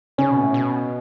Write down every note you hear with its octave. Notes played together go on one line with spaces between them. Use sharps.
C#3 C#4
B2
A2
B2